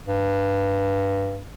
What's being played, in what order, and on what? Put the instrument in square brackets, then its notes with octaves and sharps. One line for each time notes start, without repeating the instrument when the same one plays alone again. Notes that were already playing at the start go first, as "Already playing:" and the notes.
[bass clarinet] G2